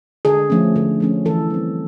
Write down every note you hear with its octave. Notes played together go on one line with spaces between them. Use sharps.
D3 G#4
F3 A3 C#4
D3
F3 A3 C#4
E3 A4
G3 C4